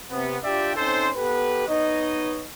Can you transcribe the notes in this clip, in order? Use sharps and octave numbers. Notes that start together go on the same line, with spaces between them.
C3 B3
D4 F4 G4 D5 E5 G5
C4 C#4 D#4 A4 C5
B3 G4 A4 B4
B3 D#4 B4 C#5 D#5